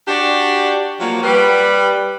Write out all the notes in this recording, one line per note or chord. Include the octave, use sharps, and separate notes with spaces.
D4 F#4 G4 D5
F3 F#3 A#3
G3 B4